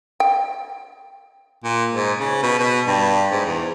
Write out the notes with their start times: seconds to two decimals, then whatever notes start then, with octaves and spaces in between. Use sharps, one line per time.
0.20 G5
1.64 A#2
1.94 G#2
2.19 C#3
2.42 B2
2.59 B2
2.87 G2
3.31 G#2
3.46 E2